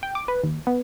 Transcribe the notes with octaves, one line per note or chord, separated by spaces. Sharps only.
G5
D6
B4
D#2
B3